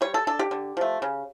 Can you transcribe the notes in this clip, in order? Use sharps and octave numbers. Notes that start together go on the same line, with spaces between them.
G3 C#5
A4
D4 A4
G4
D3
F3 A3
C#3